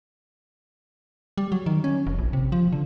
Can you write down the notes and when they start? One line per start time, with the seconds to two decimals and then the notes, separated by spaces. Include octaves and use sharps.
1.38 G3
1.52 F#3
1.66 D#3
1.84 C#4
2.07 F1
2.19 A#1
2.33 C3
2.52 F3
2.72 D3